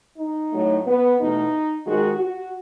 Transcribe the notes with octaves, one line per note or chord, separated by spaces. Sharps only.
D#4
A2 F#3 A3
B3
E2 B2 A3 D#4
G#2 D#3 G#3 F#4
F#4